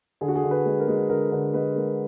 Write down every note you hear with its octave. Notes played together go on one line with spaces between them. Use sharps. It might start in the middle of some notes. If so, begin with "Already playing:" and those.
D3 G#4
F#4
G#4
D3
B4
G#3
A#4
G#3
D3 A#4
D3 B4
G#3 B4
G#3 A#4